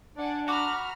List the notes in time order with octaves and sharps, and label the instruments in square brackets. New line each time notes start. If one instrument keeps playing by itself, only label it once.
[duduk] D4 [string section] D5 F#5 G#5
[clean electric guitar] F#4 [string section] A#5 B5 F6 [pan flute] D6